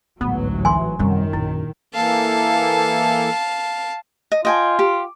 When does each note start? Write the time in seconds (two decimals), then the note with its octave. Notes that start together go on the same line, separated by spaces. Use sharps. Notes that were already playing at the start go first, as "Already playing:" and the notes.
0.21 A1 D2 G#2 F#3 B3
0.65 E3 G#5 C6
0.99 F#2 C3 D#3 G3
1.33 A#1 E4
1.95 E3 A#3 A4 F5 A5
4.32 D#5
4.45 F4 D#5 G5 G#5
4.79 G4